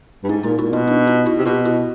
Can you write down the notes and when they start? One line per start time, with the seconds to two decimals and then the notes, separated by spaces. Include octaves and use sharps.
0.24 G2
0.29 G#2 C#4 D#4
0.43 A#2 D#4 F4
0.58 A#2 E4 F#4
0.72 B2 D#4 F4
0.87 D4 E4
1.07 D#4 F4
1.26 E4 F#4
1.38 C3
1.46 B2 F4 G4
1.65 E4 F#4